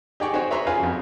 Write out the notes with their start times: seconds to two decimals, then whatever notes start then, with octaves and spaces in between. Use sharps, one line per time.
0.20 D#4 G4 G#4 D5 G5 C#6
0.33 C4 D#4 F#4 G#4 C5 C#5
0.51 B4 C#5 E5 A#5 C6
0.67 C#4 F4 G#4 B4 F5 G#5
0.80 F2 F#3